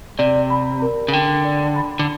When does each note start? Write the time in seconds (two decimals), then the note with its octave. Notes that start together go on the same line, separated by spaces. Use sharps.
0.19 C3 D5
0.50 B5
0.82 A#4
1.08 C#3
1.12 D3 G5
1.44 D5
1.76 B5
1.99 D3